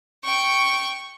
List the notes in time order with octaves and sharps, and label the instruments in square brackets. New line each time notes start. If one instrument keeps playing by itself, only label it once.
[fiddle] G5 C#6